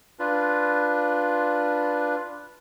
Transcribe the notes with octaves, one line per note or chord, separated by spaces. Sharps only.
D4 F4 B4